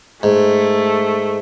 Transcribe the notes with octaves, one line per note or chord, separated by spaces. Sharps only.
G#2 A3